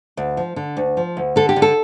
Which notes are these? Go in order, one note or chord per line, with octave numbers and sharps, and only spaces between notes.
D2
F3
D3
D2
F3
D2
D3 A4
G4
D3
A4